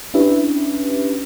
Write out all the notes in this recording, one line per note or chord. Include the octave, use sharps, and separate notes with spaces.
C#4 D4 E4 G4 B4 E5